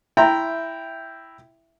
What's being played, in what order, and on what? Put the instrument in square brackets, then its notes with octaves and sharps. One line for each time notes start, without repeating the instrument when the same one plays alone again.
[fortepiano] E4 G5 A#5 [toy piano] E5 C6